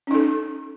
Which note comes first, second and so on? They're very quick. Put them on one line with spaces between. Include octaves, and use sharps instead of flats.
C#4 D#4 A4